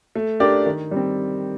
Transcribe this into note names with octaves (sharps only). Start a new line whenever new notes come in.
A3
D4 G4 A#4 D5
D#3
G3 C4